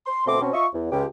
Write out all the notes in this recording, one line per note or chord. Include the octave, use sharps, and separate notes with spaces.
C6
D2 B2 A3 C4 C6 D6
B2 C4 C#4
F4 D#5 E5 C#6
E2
C#2 G4